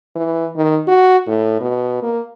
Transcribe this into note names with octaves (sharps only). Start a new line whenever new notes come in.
E3
D#3
F#4
A2
B2
A#3